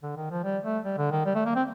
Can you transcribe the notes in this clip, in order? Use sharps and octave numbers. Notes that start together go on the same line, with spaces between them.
D3
D#3
F3
G3
A3
G3
D3
D#3
G3
A3
A#3
C4